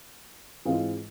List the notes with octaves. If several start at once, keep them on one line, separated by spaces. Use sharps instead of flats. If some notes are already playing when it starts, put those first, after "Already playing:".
G#2 E3 G#3 C4 F4